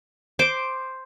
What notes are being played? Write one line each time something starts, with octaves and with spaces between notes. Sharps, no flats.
C5 D6